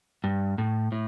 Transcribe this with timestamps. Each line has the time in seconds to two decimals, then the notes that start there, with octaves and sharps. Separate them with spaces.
0.24 G2
0.58 A2
0.92 A2